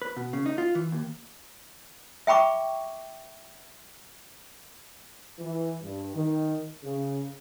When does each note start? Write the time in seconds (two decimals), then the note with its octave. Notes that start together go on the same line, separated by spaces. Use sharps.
0.02 B4
0.16 B2
0.33 C#3
0.46 D#4
0.58 F4
0.75 E3
0.92 D#2
2.27 E5 G5 B5 C#6 D6
5.39 E3
5.82 G2
6.15 D#3
6.85 C#3